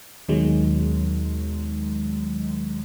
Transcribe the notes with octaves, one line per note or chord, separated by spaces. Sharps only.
D#2 B2 D#3 F#3 G#3